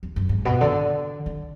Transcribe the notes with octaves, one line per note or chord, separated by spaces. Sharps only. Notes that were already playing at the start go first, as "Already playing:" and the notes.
E2
F#2
G#2
B2
D3
D3